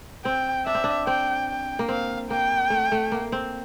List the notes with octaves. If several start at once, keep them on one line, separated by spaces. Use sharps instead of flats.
C4 G5
D4 E5
C4
D4
C4 G5
G5
A#3
C4 F5
A#3 G5
A3
A3
A#3
C4